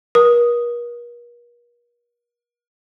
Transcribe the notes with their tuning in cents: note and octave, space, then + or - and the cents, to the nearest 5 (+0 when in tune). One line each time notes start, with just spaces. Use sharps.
A#4 +45 D#6 +0